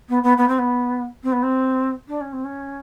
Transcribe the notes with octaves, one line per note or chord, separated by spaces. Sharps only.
B3
B3
B3
C4
B3
C4
B3
C4
D4
C#4
C4
C#4